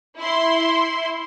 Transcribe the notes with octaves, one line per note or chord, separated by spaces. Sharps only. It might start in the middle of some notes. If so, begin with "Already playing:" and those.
E4 C6